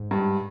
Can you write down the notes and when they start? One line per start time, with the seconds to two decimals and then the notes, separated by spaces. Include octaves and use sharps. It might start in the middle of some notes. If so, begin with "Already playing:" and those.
Already playing: G#2
0.11 G2